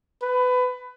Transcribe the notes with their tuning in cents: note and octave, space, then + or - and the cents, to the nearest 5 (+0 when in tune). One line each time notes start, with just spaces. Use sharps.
B4 +25